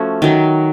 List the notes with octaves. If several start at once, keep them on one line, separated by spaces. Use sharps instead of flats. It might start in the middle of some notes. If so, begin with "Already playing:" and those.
Already playing: F3 A3 C#4 F#4
D#3 F#3